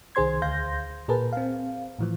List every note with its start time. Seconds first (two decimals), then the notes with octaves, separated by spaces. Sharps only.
0.15 C2 D#3 G#4 C5 C6 G#6
0.42 D2 F5 C6 G6 A#6
1.08 A#2 G#4 A#4 B4 A5
1.33 C4 F5
1.99 A2 E3 F3